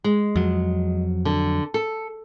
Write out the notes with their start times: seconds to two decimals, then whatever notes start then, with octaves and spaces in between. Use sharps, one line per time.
0.04 G#3
0.36 F2 F#3
1.25 D3
1.74 A4